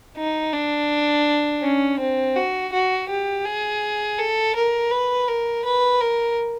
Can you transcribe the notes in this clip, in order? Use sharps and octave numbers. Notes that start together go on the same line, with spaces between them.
D#4
D4
C#4
C4
F#4
F#4
G4
G#4
A4
A#4
B4
A#4
B4
A#4